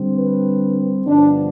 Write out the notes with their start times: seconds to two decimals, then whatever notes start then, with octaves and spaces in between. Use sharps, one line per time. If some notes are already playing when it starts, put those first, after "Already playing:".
Already playing: D3 G3 C4
0.14 B4
1.06 G2 D3 F3 B3 D4